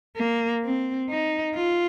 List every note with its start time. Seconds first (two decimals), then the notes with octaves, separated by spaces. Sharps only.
0.17 A#3
0.64 C4
1.10 D#4
1.56 F4